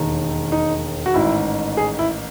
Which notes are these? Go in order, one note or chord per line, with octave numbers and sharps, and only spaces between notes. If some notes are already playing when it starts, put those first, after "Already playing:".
Already playing: E1 D#2 D#3
D#4
F#4
A1 G#2 D#3 E4
G#4
E4